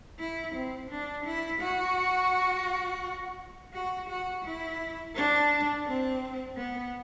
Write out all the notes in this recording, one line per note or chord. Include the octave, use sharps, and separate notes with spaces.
E4
C4
D4
E4
F#4
F#4
F#4
E4
D4
C4
B3